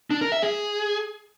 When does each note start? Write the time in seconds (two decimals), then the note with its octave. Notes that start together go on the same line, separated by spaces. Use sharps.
0.11 D4
0.21 A#4
0.32 E5
0.43 G#4